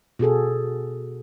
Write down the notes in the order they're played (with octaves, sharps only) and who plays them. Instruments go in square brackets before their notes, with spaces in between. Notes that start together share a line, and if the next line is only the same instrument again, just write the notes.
[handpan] B2 F#4 G#4 A4